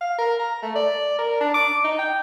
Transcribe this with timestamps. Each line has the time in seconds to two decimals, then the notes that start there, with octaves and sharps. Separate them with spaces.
0.01 F5
0.18 A#4
0.39 A#5
0.62 A3
0.75 D5
1.18 A#4
1.41 D4
1.54 D6
1.84 D#4
1.99 G5